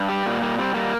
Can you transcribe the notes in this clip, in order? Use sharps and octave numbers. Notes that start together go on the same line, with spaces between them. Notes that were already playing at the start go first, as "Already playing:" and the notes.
Already playing: G2
G3 G4
A#2 A#3
G3 A#3
G3 C4
G3 A#3